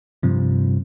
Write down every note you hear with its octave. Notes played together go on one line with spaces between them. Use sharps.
G2 C3 F3